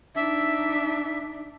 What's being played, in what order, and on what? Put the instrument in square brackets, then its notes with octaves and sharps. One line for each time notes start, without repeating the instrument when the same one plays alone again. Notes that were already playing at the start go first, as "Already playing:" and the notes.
[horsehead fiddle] D4 D#4 [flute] E5